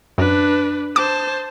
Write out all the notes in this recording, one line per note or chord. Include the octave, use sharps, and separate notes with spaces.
F#2 D4 B4
C5 A5 D6